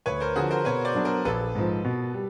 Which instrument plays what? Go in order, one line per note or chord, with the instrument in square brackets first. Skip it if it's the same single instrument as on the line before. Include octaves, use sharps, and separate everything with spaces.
[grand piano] D2 [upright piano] B4 C#5
[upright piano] A#4 C5
[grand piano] D3 F3 [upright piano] F#4 G#4
[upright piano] A#4 C5
[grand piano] B2 [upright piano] B4 C#5
[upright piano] C5 D5
[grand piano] F#3 B3 D4
[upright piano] A#4 C5
[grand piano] A#1 [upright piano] A4 B4
[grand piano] G#2 F3
B2
G3